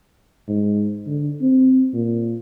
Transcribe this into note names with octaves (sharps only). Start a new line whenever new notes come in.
G#2
D3
C4
A#2